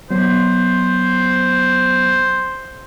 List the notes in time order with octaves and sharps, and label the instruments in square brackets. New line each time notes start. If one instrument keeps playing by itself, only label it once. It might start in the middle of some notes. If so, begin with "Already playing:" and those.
[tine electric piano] F#3 B3 [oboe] C5